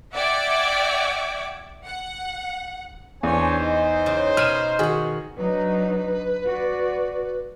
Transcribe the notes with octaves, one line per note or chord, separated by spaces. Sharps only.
D5 E5 F#5 G5 D6 G#6
F#5
E2 D4 C5 C#5 G#5
D#4
C#3
B2 G#5 B5 F6 D#7 E7
D#3 F#4 G#4 F#5
F#3 D4 D#4 B4
F#4 D5